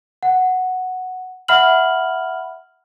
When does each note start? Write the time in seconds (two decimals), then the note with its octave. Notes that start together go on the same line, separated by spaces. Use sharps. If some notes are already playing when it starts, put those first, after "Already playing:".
0.23 F#5
1.48 E5 F#5 B5 F6 F#7